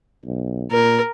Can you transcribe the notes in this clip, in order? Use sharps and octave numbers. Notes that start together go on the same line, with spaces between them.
B1
A#2 A#4